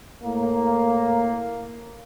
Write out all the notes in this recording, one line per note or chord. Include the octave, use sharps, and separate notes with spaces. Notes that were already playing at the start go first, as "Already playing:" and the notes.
A2 A#3